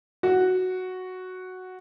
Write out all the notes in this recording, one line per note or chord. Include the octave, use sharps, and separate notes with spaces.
F#4